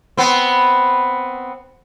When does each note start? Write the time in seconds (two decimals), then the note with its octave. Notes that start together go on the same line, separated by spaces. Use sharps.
0.17 B3 C4